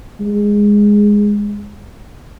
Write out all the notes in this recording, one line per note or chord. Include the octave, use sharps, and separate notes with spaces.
G#3